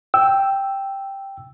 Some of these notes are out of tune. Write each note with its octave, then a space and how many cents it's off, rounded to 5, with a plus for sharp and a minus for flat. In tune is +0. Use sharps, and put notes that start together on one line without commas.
G5 +0 E6 +0